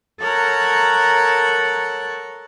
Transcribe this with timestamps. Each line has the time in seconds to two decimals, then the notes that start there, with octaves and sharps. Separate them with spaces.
0.19 A4 A#4 C#5 F#5